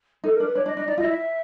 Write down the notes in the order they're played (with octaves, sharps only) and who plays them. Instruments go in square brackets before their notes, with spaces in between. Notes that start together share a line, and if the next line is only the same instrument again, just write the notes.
[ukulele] D#4 [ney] A4
[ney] A#4
[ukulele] D4
[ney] B4
[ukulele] D4 [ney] C#5
[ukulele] D4 [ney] D#5
[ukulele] D4 [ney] D#5
[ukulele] D#4 [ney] D5
[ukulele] F4 [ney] D#5
[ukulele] E4
[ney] E5